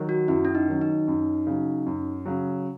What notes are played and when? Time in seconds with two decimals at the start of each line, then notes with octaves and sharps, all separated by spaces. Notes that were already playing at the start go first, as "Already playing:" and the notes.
Already playing: D#3 F#3
0.09 F#4
0.28 F#2 E4
0.45 C#4
0.55 D#4
0.68 D#3 F#3
0.81 D#4
1.08 F#2
1.47 C#3 F#3
1.86 F#2
2.26 C#3 F#3